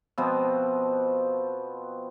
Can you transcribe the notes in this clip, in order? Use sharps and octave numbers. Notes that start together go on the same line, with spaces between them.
B2 F3 B3 C4